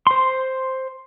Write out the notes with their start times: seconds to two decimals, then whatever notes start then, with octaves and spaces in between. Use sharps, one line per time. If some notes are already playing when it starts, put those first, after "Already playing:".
0.07 C5 C6